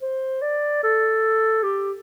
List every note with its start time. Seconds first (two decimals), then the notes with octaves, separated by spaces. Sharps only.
0.02 C5
0.42 D5
0.83 A4
1.63 G4